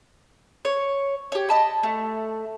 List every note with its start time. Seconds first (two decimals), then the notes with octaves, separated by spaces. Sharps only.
0.65 C#5
1.32 G4 C#5
1.49 D#5 A5 B5
1.83 A3